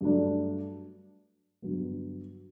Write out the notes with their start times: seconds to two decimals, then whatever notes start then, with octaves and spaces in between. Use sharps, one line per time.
0.01 G2 F#3 A3 D4
1.62 G2 D3 F#3 B3